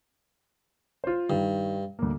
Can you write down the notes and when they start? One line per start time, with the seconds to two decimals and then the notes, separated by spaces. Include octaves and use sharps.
1.04 F4 C5
1.30 G2 D#3
1.99 D2 A#3